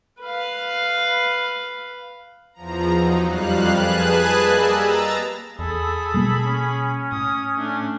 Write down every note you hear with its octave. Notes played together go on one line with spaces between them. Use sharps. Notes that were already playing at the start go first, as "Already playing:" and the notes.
B4 F5
E2 F3 A#5
F#3 D#4
F2 G3 F5 F#6
G#4 B4 G#5 A5 F#6
G3 A#3 D#5 E6 G#6
A#5 E6 A6
E2 G#4 A4 B5
B2 G3 A#3
C#4
A2 D#6
A3 D4